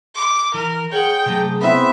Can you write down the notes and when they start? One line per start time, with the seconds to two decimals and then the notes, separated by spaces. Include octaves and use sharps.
0.15 D6
0.54 E3 A#4
0.92 G#4 C#5 F#5 G5
1.26 C3 F#3 A3
1.61 B3 C4 E4 E5